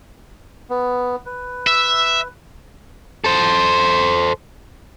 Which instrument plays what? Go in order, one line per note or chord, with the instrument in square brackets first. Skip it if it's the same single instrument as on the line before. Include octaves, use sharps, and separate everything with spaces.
[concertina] B3
B4
[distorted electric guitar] E5
[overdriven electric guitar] A4 C5